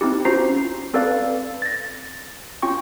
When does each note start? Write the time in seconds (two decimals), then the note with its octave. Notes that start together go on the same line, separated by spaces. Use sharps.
0.01 C4 D#4 E4 G4
0.25 C#4 F4 F#4 C5 A#5 C7
0.94 C4 A4 B4 D5 F5
1.62 A6 A#6
2.62 C#4 F4 G5 C#6